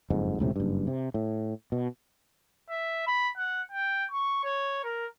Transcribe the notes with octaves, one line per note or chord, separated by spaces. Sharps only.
F#1 F2 G#2
E1 C#2 A2 C3
F#1 G2
C3
A2
B2
E5
B5
F#5
G5
C#6
C#5
A#4